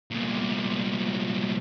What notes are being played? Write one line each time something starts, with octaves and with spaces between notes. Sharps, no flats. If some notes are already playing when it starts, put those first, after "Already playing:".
C2 A#2